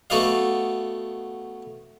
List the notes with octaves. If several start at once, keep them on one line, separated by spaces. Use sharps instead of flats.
A3 B3 F#4 D5 D#5 F5